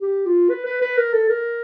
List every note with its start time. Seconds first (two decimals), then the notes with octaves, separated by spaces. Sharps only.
0.02 G4
0.26 F4
0.50 B4
0.66 B4
0.81 B4
0.97 A#4
1.13 A4
1.29 A#4